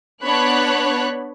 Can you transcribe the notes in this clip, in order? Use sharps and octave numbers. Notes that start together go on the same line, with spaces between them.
B3 D4 C#5 B5 F#6